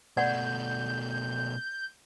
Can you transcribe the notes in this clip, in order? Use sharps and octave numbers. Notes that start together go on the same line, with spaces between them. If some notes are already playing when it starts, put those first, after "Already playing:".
B2 A3 D5 F#5 G6